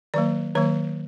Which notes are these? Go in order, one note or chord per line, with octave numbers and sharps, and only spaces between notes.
D#3 F#3 A#3 D5
D#3 F#3 A#3 C#5